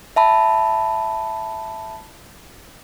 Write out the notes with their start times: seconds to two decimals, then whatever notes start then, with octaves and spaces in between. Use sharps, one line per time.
0.16 E5 A5 B5